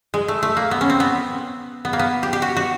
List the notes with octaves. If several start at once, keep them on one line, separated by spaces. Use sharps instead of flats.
G#3
A3
A3
A#3
B3
C#4
C4
B3
B3
A#3
B3
G4
G4
F#4
F#4